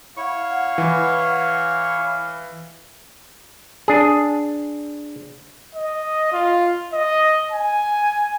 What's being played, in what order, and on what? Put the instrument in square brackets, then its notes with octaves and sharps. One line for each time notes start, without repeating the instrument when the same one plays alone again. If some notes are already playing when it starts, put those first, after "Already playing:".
[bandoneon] E4 C#5 C#6 [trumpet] F5 [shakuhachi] F#5
[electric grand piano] E3
[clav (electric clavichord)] D4 G#4
[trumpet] D#5
F4
D#5
G#5